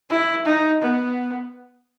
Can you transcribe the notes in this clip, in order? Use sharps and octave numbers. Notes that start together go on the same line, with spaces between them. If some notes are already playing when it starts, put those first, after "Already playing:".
E4
D#4
B3